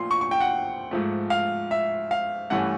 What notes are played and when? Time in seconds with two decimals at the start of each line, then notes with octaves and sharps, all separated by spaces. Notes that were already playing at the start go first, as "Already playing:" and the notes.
Already playing: A#2 F3 A3 C6
0.11 C#6
0.21 C#6
0.31 G5
0.40 F#5
0.91 G#2 F3 A3
1.30 F5
1.71 E5
2.11 F5
2.50 G2 E3 A3 C#4 F#5